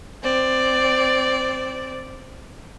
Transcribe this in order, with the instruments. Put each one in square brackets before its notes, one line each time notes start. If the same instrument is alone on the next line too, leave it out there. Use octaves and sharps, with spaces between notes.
[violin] C4 D5